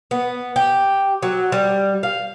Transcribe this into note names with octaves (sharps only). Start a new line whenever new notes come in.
B3
G4
F#3
G3
F5